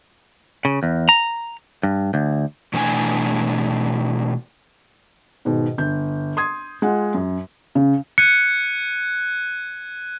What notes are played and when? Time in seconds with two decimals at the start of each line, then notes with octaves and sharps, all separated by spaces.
0.65 C#3
0.83 E2
1.09 A#5
1.83 G2
2.14 D2
2.73 B2 E3 A3 D4 A#4 G#5
5.45 G#2 B2 D#3
5.78 G1 G6
6.37 C6 D#6 G#6
6.82 G#3 F4 F#5
7.14 F#2
7.75 C#3
8.18 F#6 G#6 C#7 D#7